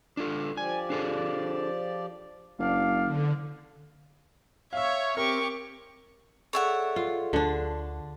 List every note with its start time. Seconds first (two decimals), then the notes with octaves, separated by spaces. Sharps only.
0.17 D4 F4 A4
0.57 F3 G4 D5 G#5
0.90 D4 G#4 A4
2.59 F#1 D4 D5 F5
3.04 D3
4.73 C#5 E5 F5 E6
5.17 C4 G4 A#4 C#6
6.53 G#4 A4 C#5 D5 E5 F#5
6.96 F4
7.33 D2 D3 D4